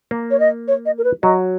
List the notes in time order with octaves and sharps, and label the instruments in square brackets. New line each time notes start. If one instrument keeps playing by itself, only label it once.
[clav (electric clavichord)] A#3
[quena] C#5
D#5
C#5
D#5
A#4
B4
[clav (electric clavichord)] F#3 [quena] D#5